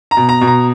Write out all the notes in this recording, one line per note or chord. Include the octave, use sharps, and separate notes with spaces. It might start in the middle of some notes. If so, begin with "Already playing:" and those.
A#5
B2
A#5
B2
A#5